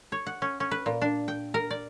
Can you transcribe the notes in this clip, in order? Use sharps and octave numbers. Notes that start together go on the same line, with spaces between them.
C#5
F#5
C#4
C#4
B4
A#2
D4
G5
A#4
D5